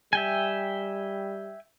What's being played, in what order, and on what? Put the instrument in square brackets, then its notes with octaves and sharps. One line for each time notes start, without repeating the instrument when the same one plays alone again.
[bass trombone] G3 [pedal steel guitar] E5 G5 G#5